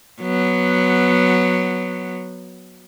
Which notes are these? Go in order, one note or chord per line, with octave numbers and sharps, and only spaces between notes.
F#3 B3